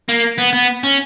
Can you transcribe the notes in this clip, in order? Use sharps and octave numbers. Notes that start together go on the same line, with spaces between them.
A#3
B3
B3
C#4